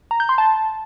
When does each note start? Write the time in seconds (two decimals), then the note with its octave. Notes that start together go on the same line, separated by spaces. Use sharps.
0.11 A#5
0.20 G6
0.29 C6
0.38 A5